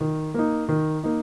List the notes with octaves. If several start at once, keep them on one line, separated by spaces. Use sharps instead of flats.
D#3
A#3 D#4
D#3
A#3 D#4